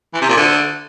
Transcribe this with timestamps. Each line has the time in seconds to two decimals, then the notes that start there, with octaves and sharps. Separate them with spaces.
0.14 E3
0.21 C3
0.29 A#2
0.37 D3